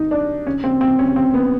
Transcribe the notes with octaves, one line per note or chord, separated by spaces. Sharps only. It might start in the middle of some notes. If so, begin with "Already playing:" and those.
Already playing: D#4
D4
C#4
C4
C4
C#4
C4
B3